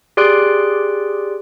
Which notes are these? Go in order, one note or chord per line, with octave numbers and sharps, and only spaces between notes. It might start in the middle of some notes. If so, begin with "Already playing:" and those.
G4 G#4 D5 C6 F#6 D7